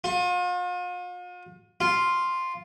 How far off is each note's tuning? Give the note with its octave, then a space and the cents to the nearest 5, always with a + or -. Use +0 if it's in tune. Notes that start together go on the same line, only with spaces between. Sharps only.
F4 +40
F4 -5